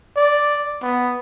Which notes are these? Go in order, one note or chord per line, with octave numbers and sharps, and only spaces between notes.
D5
B3